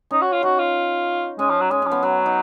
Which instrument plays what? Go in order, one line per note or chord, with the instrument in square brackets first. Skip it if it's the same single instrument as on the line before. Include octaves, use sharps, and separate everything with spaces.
[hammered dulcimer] C#4 [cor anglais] D#4
[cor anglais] F#4
F4
[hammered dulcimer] D#4 [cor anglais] F#4
[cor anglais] F4
[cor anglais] G#3 [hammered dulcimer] C#4
[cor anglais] F3
F#3
[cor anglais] G#3 [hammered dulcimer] C#4
[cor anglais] F3 [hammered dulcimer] C#4
[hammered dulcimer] B3
[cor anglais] F#3 [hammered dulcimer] B3
[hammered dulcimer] D#4